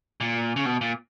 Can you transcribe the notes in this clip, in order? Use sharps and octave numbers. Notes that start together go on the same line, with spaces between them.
A#2
C#3
B2
A#2